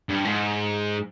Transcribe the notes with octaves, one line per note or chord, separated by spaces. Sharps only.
G2
G#2